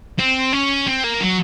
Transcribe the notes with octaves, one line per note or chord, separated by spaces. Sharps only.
C4
C#4
C4
A#3
F#3